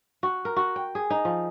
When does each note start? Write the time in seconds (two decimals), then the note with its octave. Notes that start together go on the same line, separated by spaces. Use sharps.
0.23 F#4
0.45 A#4
0.56 F#4
0.76 G5
0.95 G#4
1.10 D#4
1.25 F3